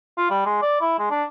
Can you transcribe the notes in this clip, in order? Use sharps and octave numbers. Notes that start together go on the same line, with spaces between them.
F4
G3
G#3
D5
E4
G#3
D4